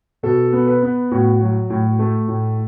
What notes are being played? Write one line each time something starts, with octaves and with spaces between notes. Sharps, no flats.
B2 A4
B3
B4
B3
A2 F#4
F#3
A2
A3
A2